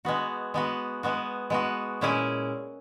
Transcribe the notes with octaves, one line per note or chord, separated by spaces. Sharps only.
G#3 B3 F#4
G#3 B3 F#4
G#3 B3 F#4
G#3 B3 F#4
A#2 G#3 C#4 E4 G#4